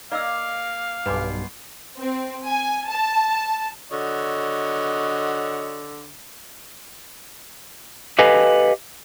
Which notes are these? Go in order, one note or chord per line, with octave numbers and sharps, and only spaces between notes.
A#3 D5 D#5 F5 E6
B1 G2 B2 B4 G#5 C6 D6
C4
G#5
A5
D3 F#4 C#5 D#5
G4 A4 B4 D#5 F5 G#5